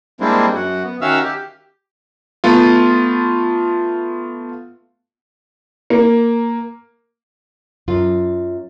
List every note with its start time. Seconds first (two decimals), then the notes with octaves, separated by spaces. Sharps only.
0.20 G3 G#3 A#3 C4 D4 E4
0.54 F#2 F#4
0.84 B3
1.01 D#3 C#4 F#4 E5 F5 E6
1.23 G4
2.44 A3 B3 F4
5.90 A#3
7.88 F#2 F4